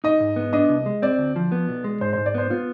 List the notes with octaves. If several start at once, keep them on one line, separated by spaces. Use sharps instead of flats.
D#4 D#5
G#2
B3
D4 D#5
C2
G#3
C4 D5
D2
F3
B3
B1
G#3
G#2 C5
G#2 C5
D5
B3 C5
B3 F4